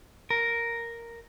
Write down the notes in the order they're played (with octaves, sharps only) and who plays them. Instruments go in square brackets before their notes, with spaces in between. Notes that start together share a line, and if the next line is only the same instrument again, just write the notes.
[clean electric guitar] A#4